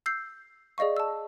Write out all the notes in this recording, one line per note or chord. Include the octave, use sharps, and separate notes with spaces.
E6 G6 C7
G#4 D5 D#5 F5 C#6
A5 E6